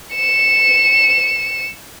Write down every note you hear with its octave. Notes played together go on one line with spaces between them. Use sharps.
C#7 E7